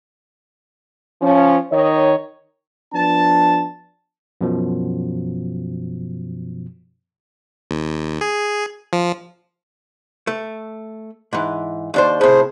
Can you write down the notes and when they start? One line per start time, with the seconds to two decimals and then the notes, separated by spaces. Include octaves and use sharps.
1.21 F3 C#4
1.72 D#3 C#5 D#5
2.94 F3 B3 D4 A5
4.41 F#2 B2 F3
7.71 D#2
8.21 G#4
8.93 F3
10.27 A3
11.33 G#2 E3
11.94 D#2 D4 C5
12.21 A2 C3 G#4 C5